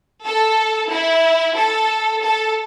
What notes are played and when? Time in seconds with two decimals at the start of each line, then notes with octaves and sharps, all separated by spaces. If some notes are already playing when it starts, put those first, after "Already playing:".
0.25 A4
0.90 E4
1.56 A4
2.21 A4